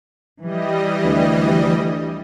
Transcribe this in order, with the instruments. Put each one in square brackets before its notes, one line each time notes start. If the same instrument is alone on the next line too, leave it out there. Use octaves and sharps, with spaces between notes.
[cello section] E3 [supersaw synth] G3 D#5
[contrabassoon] D2